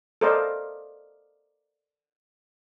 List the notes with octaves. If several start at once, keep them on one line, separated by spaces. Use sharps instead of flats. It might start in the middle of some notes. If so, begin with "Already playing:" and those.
A4 A#4 C5 D5 D#5 F5